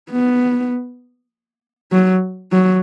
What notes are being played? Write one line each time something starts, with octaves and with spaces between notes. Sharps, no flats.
B3
F#3
F#3